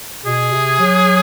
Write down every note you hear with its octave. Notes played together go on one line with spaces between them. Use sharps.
B2 G#4
C3
F#3